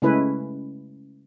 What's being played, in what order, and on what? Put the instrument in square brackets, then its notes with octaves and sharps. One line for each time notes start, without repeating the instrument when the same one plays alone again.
[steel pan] C#3 G#3 A3 C#4 E4 B4